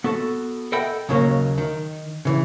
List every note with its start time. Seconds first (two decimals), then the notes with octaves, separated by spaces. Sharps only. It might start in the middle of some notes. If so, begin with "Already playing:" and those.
0.04 B3 F#4 A4
0.72 A4 D#5 E5 F#5 G5 B5
1.09 D#2 C#3 F#3 A#3
1.58 D#3
2.25 C#3 E3